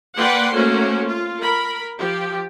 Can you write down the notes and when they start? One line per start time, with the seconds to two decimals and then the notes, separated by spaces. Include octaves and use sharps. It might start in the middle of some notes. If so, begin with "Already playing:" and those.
0.18 A#3 B4 D5 F#5 G5 C6
0.55 A3 A#3 C#4 F#4 C5
1.07 F4
1.41 A#4 B5
1.96 F3 G4